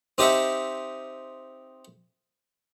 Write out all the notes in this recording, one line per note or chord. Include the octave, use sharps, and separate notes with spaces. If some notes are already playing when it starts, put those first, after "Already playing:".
C4 D#4 G4 D#5 E5 F#5